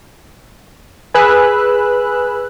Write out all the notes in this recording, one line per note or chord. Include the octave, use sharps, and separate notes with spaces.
G#4 B4 E6 F#6